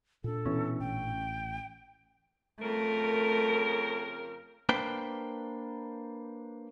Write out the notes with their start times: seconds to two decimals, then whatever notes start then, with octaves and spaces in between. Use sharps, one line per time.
0.24 A#2 D4 A4
0.45 B2 E3 C#4
0.80 A1 G5
2.62 F2 C#3 A3 A#4
4.69 A#3 D4 B4 C5 G5